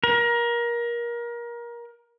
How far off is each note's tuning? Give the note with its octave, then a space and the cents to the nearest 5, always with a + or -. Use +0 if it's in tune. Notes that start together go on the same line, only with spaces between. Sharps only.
A#4 +25